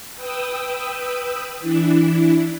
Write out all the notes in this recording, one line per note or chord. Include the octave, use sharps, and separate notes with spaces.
B4 G5 D#6 E6
E3 D4 E4